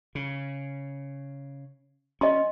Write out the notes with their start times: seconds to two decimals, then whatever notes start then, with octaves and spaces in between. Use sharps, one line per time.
0.15 C#3
2.21 C#4 D#5 C6